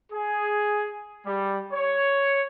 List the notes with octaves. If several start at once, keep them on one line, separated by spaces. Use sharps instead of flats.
G#4
G3
C#5